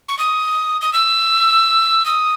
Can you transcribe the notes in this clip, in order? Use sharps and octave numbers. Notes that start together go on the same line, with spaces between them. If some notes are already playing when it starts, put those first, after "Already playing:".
C#6
D#6
D#6
E6
D#6